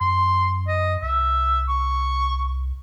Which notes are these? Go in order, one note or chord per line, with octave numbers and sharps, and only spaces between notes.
F#2 C6
D#5
C2 E5
C#6